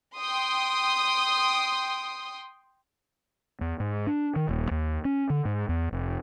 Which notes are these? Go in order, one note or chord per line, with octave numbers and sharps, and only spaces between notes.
G5 C6 D#6
E2
G#2
D4
D#3
D#1
D#2
C#4
D3
G#2
E2
F1